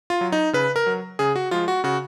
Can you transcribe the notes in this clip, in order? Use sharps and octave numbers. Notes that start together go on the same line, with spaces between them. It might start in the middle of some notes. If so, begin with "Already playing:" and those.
F4
F#3
D#4
C#3 B4
A#4
F#3
C#3 G#4
F#4
F3 G#3 F4
F#4
C#3 F#4